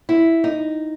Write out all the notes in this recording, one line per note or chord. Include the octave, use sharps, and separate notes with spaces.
E4
D#4